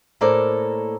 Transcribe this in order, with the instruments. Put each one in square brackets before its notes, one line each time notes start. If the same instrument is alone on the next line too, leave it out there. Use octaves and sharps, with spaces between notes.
[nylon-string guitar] A2 A#3 A4 A#4 C5 D5